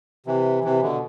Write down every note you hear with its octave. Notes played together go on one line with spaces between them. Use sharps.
C3 E3
C3 E3
B2 D3